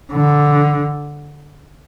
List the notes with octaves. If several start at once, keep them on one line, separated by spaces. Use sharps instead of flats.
D3